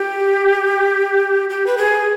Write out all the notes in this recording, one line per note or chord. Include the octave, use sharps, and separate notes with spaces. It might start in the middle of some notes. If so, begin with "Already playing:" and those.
Already playing: G4
G4
B4
G#4